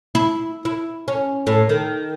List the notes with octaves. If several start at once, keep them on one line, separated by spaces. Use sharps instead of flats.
E4
E4
C#4
A2
D#3